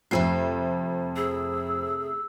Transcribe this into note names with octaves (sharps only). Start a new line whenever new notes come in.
F2 C3 A3 A4 C7
G#4 E6